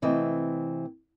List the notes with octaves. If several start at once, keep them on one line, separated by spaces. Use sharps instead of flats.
C3 E3 A3 C4 D#5